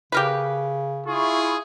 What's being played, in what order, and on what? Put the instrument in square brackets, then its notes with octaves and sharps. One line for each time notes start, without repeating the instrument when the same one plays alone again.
[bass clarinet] C#3 [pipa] G4 A#4 B4
[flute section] E4 C#6 [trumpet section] F4 G#4